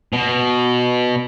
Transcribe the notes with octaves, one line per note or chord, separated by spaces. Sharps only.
B2